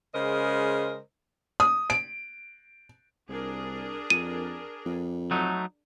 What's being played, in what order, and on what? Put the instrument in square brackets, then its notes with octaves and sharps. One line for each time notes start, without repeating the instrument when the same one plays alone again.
[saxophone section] C#3 G#3 A#4 C5 D#5
[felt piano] D#6
D7
[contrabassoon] C2 [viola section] D4 G#4 A#4
[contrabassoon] F2 [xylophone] D#7
[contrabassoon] F2
[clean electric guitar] F#3 A3 D#4